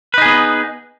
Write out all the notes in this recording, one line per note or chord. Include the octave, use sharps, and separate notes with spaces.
B3 D#4 G#4 B4